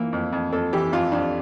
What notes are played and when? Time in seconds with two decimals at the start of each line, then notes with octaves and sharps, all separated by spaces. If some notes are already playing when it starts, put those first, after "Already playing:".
Already playing: E3 A#3
0.13 F2
0.33 F2
0.53 F2 A4
0.73 E3 G4
0.92 F2 F4
1.12 F2 D4